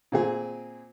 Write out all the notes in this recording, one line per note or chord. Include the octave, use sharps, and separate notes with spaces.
A#2 C4 G#4